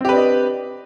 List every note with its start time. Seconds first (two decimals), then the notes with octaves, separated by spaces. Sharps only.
0.01 C4
0.05 G4
0.09 B4
0.13 D4
0.17 D#5